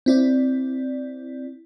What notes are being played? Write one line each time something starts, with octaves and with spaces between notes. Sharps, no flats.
C4 E4 D5